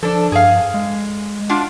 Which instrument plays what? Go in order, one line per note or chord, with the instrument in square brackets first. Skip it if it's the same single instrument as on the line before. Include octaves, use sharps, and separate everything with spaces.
[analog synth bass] F3 [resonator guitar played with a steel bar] D4 A4
[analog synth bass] G2 [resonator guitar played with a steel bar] G#4 F5
[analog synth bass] G#3
[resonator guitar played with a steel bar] D4 F4 F#5